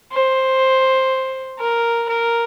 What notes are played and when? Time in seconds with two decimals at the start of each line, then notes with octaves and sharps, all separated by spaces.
0.12 C5
1.59 A#4
2.09 A#4